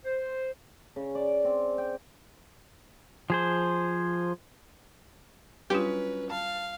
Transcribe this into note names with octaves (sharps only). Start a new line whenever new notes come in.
C5
C#3
D5
C4
G5
F3 G#4 C5
F#3 G3 C#4 D4 F4 G4 B4
F5 A5